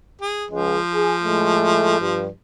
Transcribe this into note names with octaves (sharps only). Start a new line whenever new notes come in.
G#4
C#2 F3 G#3
G#4
A2 G#3 A3
G2